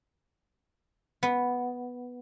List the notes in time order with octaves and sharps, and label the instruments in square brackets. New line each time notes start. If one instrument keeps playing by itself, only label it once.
[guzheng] B3